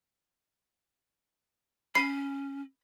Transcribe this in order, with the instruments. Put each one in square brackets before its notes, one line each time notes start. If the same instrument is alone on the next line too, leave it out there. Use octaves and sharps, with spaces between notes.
[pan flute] C#4 [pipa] B5 [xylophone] C7